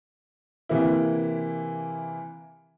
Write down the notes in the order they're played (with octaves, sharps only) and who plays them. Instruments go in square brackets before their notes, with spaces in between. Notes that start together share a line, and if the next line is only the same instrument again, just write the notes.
[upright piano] C3 E3 A#3 E4